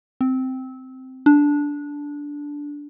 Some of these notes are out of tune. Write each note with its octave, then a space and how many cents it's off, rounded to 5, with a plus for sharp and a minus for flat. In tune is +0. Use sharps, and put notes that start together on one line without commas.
C4 -10
D4 -10